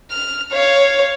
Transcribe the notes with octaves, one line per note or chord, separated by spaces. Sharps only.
F6
C#5 F5